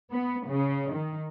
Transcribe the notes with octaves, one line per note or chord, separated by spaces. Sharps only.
B3
C#3
D#3